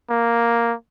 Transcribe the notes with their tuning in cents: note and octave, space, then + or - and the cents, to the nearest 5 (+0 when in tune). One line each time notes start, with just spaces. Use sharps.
A#3 +0